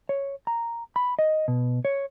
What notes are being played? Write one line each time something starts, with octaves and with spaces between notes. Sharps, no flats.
C#5
A#5
B5
D#5
B2
C#5